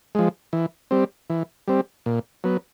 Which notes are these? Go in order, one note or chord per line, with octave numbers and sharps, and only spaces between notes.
F3 G#3
E3
G3 C4
E3
G3 C4
A#2
F#3 B3